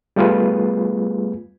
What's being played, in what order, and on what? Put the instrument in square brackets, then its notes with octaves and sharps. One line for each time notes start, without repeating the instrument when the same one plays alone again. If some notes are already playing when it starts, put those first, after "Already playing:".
[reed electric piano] G3 A3 B3 F4 G#4 B4